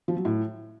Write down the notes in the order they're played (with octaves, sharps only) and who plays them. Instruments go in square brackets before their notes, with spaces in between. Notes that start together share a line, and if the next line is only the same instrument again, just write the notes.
[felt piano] F3
F#3
A2